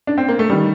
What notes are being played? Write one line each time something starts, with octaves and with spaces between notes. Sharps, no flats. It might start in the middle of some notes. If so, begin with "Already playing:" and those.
D4
C4
A#3
A3
D#3 G3